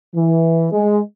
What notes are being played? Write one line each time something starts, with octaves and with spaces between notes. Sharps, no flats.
E3
G#3